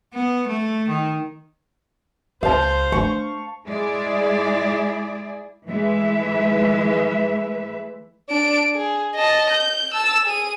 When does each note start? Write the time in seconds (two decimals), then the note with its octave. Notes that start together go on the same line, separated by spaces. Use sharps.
0.14 B3
0.48 A3
0.89 D#3
2.43 C#2 C5 F5 A5
2.92 A3 D4 C#6
3.67 G#3 E4 G#4 D5
5.68 E3 G#3 A3 B4 E5
8.29 D4 D7
8.74 G#4
9.15 D#5 A5
9.50 G6
9.94 A5 E6
10.25 G#4 D#7